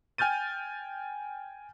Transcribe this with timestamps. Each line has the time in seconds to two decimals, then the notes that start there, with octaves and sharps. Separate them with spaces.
0.18 G5 G#5 F6 G6 A6 D#7